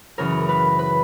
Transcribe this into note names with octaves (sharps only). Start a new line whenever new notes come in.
F#2 C#3 E3 A#4
A#4
B4
B4